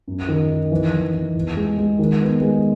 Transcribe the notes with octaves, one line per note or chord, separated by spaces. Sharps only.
F#2
D#3
D#4
E3
E3
E3
E2
G#3
G#3
D#3
B3
G#3